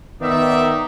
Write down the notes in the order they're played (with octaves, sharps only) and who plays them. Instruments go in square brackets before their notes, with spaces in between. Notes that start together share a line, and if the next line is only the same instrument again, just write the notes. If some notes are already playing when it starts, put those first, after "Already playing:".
[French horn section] D#3 [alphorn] B3 [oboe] D#4 [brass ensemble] D5 E5